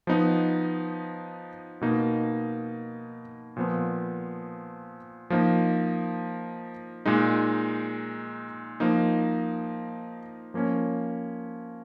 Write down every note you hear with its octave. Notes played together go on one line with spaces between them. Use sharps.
F3 B3 D#4
B2 A#3 D#4
A#2 F3 B3
F3 A#3 D#4
A#2 G#3 D#4
F3 A#3 D#4
F3 A#3 C#4